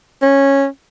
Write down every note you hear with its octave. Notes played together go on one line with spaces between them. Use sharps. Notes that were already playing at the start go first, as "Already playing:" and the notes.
C#4